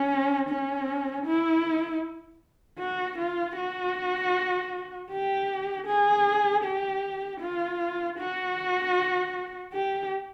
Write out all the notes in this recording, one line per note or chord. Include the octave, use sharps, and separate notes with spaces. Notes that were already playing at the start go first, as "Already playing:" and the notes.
Already playing: C#4
C#4
E4
F#4
F4
F#4
G4
G#4
G4
F4
F#4
G4